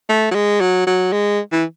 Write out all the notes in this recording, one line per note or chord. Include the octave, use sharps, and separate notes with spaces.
A3
F#3
G#3
F#3
F#3
G#3
E3